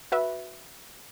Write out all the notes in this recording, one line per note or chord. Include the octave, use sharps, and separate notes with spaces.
F#4 B4 E5